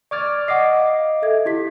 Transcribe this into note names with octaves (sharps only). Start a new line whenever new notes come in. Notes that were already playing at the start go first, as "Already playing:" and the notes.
D5 C#6 D6 F6 G#6 A6
D#5 F#5 D6 C7
F5
A4 E5 G#6
E4 G4 B6